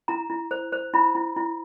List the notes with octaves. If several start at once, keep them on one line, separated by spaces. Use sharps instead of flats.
E4 A#5
E4
C5
C5
E4 B5
E4
E4